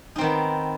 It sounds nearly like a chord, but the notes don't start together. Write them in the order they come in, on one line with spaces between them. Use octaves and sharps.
D#4 C4 D#3 B3